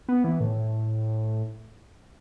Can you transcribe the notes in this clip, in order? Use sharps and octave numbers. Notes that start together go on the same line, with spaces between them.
B3
E3
A2